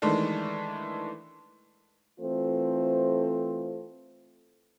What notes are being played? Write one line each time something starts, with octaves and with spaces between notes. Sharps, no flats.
D#3 E3 G#3 A3 D4
E3 A3 C4 F4 A4 C5